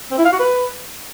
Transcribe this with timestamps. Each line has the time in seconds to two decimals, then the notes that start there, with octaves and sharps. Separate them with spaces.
0.11 C4
0.18 E4
0.25 F5
0.32 F#4
0.39 B4